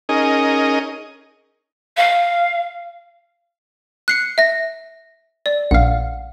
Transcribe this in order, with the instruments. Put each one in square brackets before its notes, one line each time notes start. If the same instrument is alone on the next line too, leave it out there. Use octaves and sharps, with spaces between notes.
[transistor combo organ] C#4 D#4 G#4 A#4 D#5
[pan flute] F5
[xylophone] F#6 C7 C#7
E5 A#6
D5
[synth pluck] A#1 F5 [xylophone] F#5